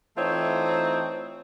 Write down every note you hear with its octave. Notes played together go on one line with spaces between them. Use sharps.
E3 A3 C4 D#4 F4 C#5